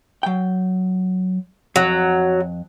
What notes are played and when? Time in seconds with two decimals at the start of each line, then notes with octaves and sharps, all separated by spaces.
0.23 F#3 G5
1.76 F2 F#3